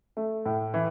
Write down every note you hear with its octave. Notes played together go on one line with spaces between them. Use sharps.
A3
A2
E3